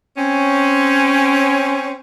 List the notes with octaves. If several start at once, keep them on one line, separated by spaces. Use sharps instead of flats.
C4 C#4